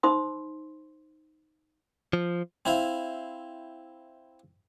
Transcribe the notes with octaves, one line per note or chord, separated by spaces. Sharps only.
D#4 C5 B5 C6 D#6
F3
C4 E4 F5